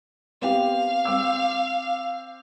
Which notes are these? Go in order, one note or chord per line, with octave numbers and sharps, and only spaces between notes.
B3 C4 G4 F5
C4 D6 E6